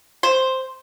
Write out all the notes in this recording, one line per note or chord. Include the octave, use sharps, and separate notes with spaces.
C5